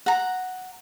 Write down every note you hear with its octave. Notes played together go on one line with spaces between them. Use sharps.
F#5 A#5